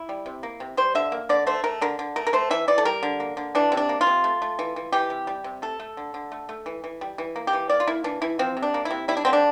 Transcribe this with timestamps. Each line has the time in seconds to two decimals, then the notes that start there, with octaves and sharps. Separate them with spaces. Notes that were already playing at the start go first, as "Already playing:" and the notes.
Already playing: E4
0.09 G3
0.26 C3
0.43 A#3
0.60 C3
0.77 G3 C5
0.95 D3 E5
1.12 A#3
1.29 D3 D5
1.47 A3 C5
1.64 A3 A#4
1.81 D3 A#4
1.99 D3
2.16 A3 A#4
2.27 A#4
2.33 A3 C5
2.51 E3 E5
2.68 E3 D5
2.78 A4
2.85 G3 A#4
3.03 D3
3.20 A#3
3.37 D3
3.55 E3 D4
3.72 C3
3.77 D4
3.89 A#3
4.01 F4
4.07 C3
4.24 A3
4.42 A3
4.59 E3
4.76 E3
4.92 E3 G4
5.10 C3
5.27 G3
5.44 C3
5.62 A3 A4
5.80 A3
5.97 D3
6.14 D3
6.32 A3
6.49 A3
6.66 E3
6.84 E3
7.01 G3
7.18 E3
7.36 A#3
7.47 G4
7.53 E3
7.69 A#3 D5
7.80 F4
7.87 A#3 E4
8.04 E3 D4
8.22 E3 E4
8.39 F3 C4
8.57 C3
8.62 D4
8.74 A#3
8.85 E4
8.91 C3
9.08 G3 E4
9.17 D4
9.25 D3 C4
9.33 D4